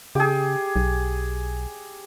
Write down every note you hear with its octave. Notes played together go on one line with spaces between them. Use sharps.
C#3 G4 G#4
B1